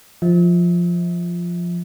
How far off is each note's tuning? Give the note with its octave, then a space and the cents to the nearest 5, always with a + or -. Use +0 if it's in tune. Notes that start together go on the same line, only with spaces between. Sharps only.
F3 +0 E5 -40